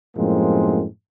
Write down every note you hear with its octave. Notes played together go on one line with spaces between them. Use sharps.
F#2 A2 F3 G#3 A#3 C4